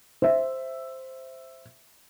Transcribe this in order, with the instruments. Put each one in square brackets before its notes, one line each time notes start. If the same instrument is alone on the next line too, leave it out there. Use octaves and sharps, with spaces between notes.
[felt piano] C5 E5